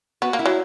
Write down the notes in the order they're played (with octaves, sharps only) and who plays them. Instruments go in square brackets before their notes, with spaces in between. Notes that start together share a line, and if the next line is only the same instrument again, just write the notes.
[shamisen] B3 [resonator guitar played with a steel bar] F#4
[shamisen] A#3
[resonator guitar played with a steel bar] E4
[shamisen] F#3